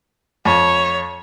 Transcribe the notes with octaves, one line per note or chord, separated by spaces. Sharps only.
F2 C#5